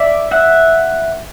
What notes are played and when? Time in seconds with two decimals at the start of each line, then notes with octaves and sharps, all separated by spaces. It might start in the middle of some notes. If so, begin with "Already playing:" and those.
Already playing: D5 E5
0.31 E5 F#5